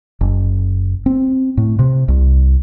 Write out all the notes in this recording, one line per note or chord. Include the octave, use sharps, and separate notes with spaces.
F#1
C4
A2
C3
C2